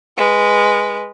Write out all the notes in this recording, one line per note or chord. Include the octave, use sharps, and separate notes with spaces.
G#3 B4